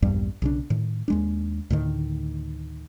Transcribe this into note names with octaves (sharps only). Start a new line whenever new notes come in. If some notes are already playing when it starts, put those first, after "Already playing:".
A#1 E2 G2 G3
B1 C#3 D4
A2 D#3
D#2 G#3 D4
D2 A2 D3 D#3